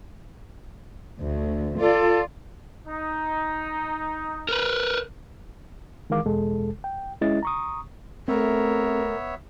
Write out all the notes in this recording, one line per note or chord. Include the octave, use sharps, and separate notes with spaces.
D2
F4 A4 D5
D#4
A#4 B4
D#3 E3 G#3 A#4 F5 D6
E2 B2 G#3 A4
G5
G#3 C#4 E4 D#5 A6
A#5 C#6 D#6
A3 B3 C4 A#4 C#5 E5